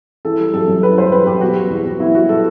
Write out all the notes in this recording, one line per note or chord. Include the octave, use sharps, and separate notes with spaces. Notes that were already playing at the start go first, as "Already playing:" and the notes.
E3 A4
G3
F#2 A4
F#2
E3 B4
G3 C5
F#2 B4
F#2 G4
B2 F#4
G3
E2
E2
B2 E4
G3 F#4
A4